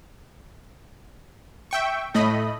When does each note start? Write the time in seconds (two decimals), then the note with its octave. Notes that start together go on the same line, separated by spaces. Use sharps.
1.71 E5 G5 C#6
2.14 A2 A3 D#5 B5